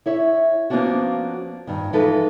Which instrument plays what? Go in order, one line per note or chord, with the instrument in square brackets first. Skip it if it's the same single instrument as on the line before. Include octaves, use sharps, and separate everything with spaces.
[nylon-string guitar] E4 C#5 E5
F3 A#3 B3 C#4 D4 F#4
G2 D#3
E3 F3 G#3 D#4 A4 B4